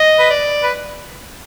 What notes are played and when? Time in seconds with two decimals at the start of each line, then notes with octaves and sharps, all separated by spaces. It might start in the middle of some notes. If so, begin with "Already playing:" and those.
Already playing: D#5
0.19 B4
0.30 D5
0.63 B4